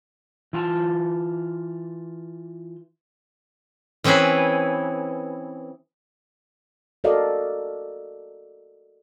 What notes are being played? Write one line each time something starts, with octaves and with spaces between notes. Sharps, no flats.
E3 F4 G#5 A5
E3 C4 C#4 E4 G#4 B4
F#4 A4 A#4 D5 D#5 F5